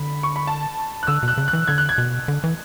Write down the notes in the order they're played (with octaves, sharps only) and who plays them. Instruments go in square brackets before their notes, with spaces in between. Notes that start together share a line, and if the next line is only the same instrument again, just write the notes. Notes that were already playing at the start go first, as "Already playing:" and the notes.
Already playing: [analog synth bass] D3 [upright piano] B5
[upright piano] C#6
B5
A5
F#6
[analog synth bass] D3 [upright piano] E6
[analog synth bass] B2
[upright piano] F#6
[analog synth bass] C#3
[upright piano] F#6
[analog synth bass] E3
[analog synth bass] D3 [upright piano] G#6
[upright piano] F#6
G#6
[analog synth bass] B2
D3
E3